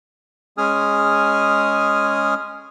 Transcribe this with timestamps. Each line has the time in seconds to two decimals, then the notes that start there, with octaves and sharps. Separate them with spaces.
0.58 G#3 C#4 G#4 G#5 D#6 F6